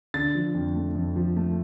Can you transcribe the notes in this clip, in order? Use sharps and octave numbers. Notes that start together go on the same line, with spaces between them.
D3 A6
F3
F2
A3
F2
F3
A3